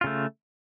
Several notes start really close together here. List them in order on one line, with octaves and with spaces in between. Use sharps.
F4 C#3 A3